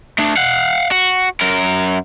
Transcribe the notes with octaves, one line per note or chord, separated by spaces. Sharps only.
A3 D4
F5 F#5
F#4
F#2 A#4